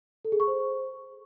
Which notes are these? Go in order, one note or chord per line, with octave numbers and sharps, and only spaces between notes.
A4
G#4
C#6
C5